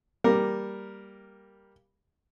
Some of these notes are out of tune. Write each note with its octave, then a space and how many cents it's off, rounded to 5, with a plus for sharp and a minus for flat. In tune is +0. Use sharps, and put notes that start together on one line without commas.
G3 +0 A#3 +0 A#4 +0